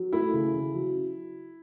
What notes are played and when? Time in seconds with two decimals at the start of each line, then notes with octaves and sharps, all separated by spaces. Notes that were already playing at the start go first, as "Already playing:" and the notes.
Already playing: F#3
0.13 A3 E4
0.34 C#3
0.54 C#3
0.75 F#3